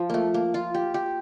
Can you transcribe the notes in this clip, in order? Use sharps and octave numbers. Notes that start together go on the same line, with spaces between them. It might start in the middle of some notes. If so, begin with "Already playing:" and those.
Already playing: F3
A3 A#3
A#3
F4
G4
G4